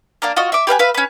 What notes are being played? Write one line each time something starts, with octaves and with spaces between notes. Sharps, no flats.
A#3 D4 A#4
F4 F#4 D#5
E5 D6
G4 B4 F5 G#5
B4 E5 F5
C#4 B4